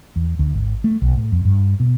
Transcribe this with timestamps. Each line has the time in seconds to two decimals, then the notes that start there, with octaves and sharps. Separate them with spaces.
0.16 E2
0.39 D2
0.54 G#1
0.84 A3
1.02 B1
1.16 A2
1.32 F2
1.45 G2
1.80 B2